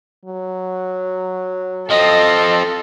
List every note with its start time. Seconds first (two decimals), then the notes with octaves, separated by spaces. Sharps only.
0.25 F#3
1.90 F3 C4 A4 D#5